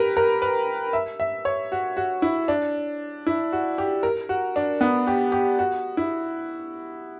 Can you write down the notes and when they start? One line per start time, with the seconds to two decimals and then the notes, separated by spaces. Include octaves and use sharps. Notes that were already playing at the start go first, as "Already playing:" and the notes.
Already playing: G4 A#4 B4
0.17 A#4
0.42 B4
0.93 E5
1.20 E5
1.45 C#5
1.72 F#4
1.97 F#4
2.22 E4
2.48 D4
3.26 E4
3.53 F#4
3.78 G4
4.03 A#4
4.29 F#4
4.56 D4
4.81 B3
5.07 G4
5.32 G4
5.59 F#4
5.97 E4